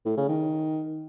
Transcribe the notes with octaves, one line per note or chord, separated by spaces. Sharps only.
A2
C#3
D#3